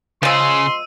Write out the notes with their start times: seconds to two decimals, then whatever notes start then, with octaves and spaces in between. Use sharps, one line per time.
0.23 C#3 F3 G#3 C6 E6 D#7